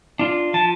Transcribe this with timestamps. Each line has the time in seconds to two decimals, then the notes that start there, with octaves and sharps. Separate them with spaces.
0.19 D4 F4
0.54 F3 A5